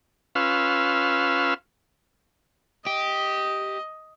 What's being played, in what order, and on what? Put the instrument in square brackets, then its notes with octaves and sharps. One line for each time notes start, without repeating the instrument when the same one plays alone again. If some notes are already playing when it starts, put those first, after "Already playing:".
[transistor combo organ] C#4 F4 B4 F5 E6
[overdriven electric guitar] G4 [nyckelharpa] D#5